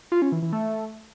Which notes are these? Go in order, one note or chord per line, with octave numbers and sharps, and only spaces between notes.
F4
C#4
E3
E3
A3